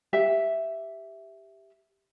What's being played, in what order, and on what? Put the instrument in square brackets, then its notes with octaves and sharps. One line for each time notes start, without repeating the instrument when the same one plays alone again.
[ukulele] G4 E5 F5